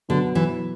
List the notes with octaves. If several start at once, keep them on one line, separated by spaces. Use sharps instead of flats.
B2 D3 F#3 B3 F#4 B4
E3